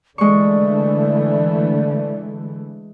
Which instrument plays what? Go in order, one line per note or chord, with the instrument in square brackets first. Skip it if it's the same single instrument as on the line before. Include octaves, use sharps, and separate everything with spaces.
[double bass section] D3 E3 A3 [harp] G#3 C#6 [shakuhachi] D5